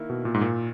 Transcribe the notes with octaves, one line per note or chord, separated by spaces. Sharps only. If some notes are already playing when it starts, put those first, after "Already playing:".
Already playing: D#3 A#3 E4
B2
A#2
G#2
A#2